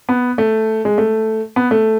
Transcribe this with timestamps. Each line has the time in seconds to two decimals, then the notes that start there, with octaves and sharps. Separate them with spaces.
0.09 B3
0.38 A3
0.85 G#3
0.98 A3
1.56 B3
1.71 A3